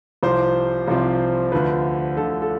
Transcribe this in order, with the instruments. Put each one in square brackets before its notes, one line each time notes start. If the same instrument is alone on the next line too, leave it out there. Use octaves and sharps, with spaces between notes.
[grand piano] C2 C3 F3 C4 C5
C2 C3 F3 C4
D2 D3 F3 B4
D2 D3 F3 A4
A4